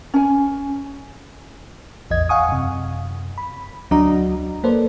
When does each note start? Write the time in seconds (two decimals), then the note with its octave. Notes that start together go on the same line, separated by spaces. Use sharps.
0.14 C#4 G#5
2.11 A1 E2 D#5 G#6
2.29 F5 F#5 G#5 C#6 D#6
2.49 F#2 C3
3.38 B5
3.91 D2 F#3 D4 F#4 D#5 A#5
4.64 A#3 A4 B4 C5 D5